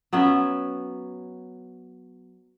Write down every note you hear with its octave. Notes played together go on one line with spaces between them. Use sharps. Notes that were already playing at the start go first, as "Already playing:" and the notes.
F#3 B3 C#4 E5